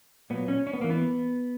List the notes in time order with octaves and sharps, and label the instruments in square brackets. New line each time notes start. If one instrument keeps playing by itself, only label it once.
[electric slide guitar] A#2 F#3 B3
C#4
C#4
B3
E3 A#3
B3